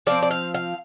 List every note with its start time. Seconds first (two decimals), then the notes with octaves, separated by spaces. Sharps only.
0.07 F3 C4 D5
0.22 D5
0.31 F5
0.54 F5